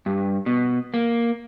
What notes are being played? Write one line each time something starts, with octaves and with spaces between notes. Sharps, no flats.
G2
B2
A#3